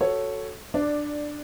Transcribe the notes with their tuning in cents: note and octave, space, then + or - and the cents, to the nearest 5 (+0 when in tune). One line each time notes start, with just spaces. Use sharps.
F#4 +0 A4 +0 C#5 +0
D4 +10 D5 +0